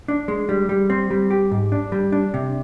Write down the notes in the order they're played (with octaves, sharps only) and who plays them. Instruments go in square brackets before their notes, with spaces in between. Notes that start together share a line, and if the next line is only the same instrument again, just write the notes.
[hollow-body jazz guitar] D4
G#3
G3
G3
C4
G3
G4
G#2
D4
G3
D4
C3